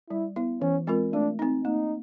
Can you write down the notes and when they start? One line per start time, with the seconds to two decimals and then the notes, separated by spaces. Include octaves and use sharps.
0.10 G3 E4
0.36 B3 E4
0.62 E3 C#4
0.87 G#3 C4 F4 A#4
1.13 A3 D4
1.39 C4 D#4
1.64 A#3 D#4